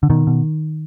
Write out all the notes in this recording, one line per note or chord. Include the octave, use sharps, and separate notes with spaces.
D3
B2 D#3
B2